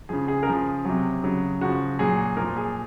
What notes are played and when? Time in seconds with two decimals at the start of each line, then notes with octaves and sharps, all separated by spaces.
0.09 C#3 F3 G#4
0.28 G#4
0.43 A#4
0.47 C#3 F3 G#4
0.85 C3 F#3
1.23 C#3 F#3
1.61 C#3 F3 F#4
1.99 A#2 F#3 G#4
2.37 A#2 F3 A#4
2.57 G#4